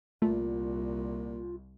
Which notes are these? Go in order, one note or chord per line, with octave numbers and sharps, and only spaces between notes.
C2 A#2 A3 F4